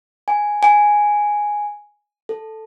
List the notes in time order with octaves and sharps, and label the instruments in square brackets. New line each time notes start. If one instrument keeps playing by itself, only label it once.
[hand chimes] G#5
G#5
A4